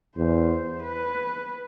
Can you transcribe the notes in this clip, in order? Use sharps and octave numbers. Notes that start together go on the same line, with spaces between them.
E2 C5
B4